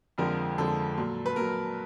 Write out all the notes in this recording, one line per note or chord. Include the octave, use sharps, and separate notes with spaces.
F2 D3 F3 G#3 A#4
F2 D3 F3 G#3 A4
A#2 F#3
B4
A#2 F#3 A#4